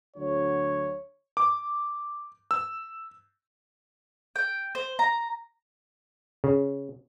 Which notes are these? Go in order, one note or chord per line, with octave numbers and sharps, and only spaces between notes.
D2 D3 F#3 C#5
D6
E6
G5
C5
A#5
C#3